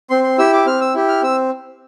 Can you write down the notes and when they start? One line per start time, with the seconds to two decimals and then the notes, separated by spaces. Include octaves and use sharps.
0.10 C4 C6
0.24 C6
0.38 E4 G4 E6
0.53 D6
0.66 C4 F6
0.81 E6
0.94 E4 G4
1.08 F6
1.22 C4 E6